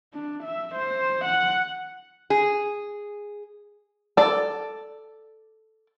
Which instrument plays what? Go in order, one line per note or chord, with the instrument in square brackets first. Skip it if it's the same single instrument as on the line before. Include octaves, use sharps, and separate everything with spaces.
[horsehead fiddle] D4
E5
C5
F#5
[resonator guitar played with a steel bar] G#4
[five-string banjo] A4 D5